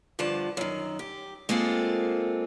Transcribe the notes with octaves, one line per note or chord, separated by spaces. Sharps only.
G2 D3 F3 A5
F#2 D#3
G4
G#3 A#3 C4 F4 A4